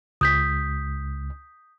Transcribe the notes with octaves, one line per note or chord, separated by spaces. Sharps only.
C#2 D#6 G6 B6